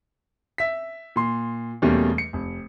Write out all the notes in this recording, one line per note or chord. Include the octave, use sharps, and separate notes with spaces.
E5 B6
A#2 C6
E2 B2 G3 A3 A#3 C#4
C#7
F1